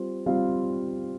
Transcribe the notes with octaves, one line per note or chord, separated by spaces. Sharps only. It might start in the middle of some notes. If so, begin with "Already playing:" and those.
Already playing: G3 C4 F4 C5
G3 C4 F4 C5 F5